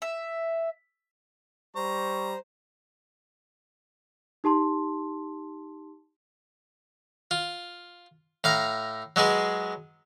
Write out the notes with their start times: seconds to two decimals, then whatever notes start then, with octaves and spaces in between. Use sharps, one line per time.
0.02 E5
1.76 G3 C5 A#5 C#6
4.44 D#4 G4 A5 C6
7.31 F4
8.44 A2 F5 A#5
9.16 F#3 G#3 B3 G#4